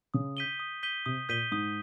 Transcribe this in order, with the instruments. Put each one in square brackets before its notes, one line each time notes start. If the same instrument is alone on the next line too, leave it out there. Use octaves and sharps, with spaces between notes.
[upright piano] C#3 [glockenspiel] D#6
[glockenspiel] G6 B6 D#7 G7
D#6
G6 B6 D#7 G7
[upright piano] C3 [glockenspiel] D#6
[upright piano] A#2 [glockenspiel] G6 B6 D#7 G7
[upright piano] G#2 [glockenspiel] D#6